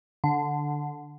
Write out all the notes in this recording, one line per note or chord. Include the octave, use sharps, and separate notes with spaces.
D3